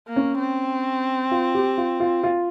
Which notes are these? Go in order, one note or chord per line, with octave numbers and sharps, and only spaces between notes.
A#3
C#4
C4
F4
G4
F4
F4
F4